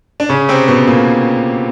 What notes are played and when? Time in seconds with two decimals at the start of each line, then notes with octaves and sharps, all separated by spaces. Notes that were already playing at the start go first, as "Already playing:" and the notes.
0.20 D4
0.29 C#3 C#4
0.49 C3 C4
0.68 B2 B3
0.87 A#2 A#3